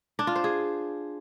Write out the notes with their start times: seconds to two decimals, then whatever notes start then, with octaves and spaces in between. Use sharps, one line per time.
0.19 D4
0.27 F4
0.36 C5
0.44 G#4